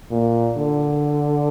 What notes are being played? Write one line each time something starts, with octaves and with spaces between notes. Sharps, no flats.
A#2
D3